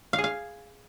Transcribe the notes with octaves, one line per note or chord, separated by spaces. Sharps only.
F5
G#4
F5